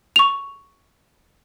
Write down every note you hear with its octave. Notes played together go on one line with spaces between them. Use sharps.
C#6 F7